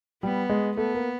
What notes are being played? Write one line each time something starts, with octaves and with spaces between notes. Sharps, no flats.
G3 B3
G#3
A3 B3
A#3